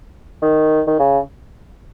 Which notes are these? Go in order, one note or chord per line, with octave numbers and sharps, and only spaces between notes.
D#3
D#3
C#3